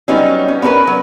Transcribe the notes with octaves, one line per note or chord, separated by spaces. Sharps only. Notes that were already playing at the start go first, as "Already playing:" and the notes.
F#3 G3 B3 C#4 D#4
C#4
B3 C#4 D4 A#4 B4
F#3